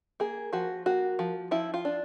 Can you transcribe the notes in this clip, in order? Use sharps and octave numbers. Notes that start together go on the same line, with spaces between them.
A#3 G#4
F3 F#4
A#3 F#4
F3
F3 E4
F4
D4